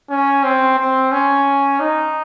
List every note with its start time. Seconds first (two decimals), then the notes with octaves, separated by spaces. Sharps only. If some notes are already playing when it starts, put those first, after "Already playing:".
0.10 C#4
0.44 C4
0.78 C4
1.12 C#4
1.80 D#4